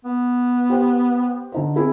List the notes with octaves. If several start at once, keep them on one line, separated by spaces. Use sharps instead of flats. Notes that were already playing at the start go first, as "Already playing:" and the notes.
B3
G4 C5 G5
D3 D#4 C5
C4 E4 G#4